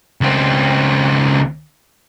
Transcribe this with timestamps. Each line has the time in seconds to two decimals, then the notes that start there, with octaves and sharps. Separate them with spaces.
0.21 C#2 C4